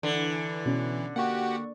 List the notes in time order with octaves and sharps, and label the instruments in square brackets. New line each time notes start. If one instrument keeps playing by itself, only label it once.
[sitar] D3 [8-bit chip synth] E3
[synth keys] B2 C#4
[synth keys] A#3 C#6 [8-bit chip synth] F#4 G4 F#5